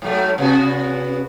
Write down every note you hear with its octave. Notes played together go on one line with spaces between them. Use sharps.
G#2 F#3 A3
C3 B3 F#4